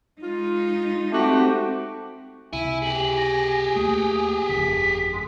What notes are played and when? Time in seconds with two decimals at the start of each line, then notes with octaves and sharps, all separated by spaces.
0.21 G#3 D#4 F4
1.12 A3 C4 F#4 G4
2.53 C#2 C3 E4 G#5 D#7
2.82 G4 G#4 F#7
3.17 A#6
3.76 D#2 A3 A#3 D#6
4.49 G1 F2 C#3 B6
5.13 G#3